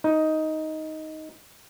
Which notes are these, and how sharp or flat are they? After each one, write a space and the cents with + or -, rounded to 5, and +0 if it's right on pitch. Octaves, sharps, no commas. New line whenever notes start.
D#4 +10